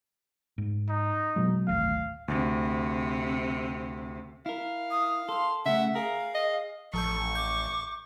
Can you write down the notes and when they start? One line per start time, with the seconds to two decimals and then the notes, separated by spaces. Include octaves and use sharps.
0.58 G#2
0.89 D#4
1.36 B2 F#3 G#3
1.68 D1 G#1 A3 F5
2.28 D2 C3
4.46 E4 A#4 F5
4.91 D#6
5.29 A4 C6
5.66 C#3 A3 E5 F#5
5.95 G#4 A#4 F5
6.35 D#5
6.93 A1 F3 A4 A5 C#6 G6
7.35 D6 G6